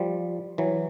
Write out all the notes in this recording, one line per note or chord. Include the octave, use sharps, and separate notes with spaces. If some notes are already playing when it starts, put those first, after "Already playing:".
Already playing: F3 G3
E3 F#3